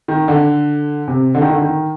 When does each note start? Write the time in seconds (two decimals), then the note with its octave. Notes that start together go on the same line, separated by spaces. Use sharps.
0.08 D#3
0.28 D3
1.08 C3
1.35 D3
1.41 D#3
1.49 D3
1.62 D#3